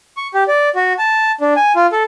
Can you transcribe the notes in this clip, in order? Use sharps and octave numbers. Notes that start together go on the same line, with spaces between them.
C#6
G4
D5
F#4
A5
D4
G#5
F4
A4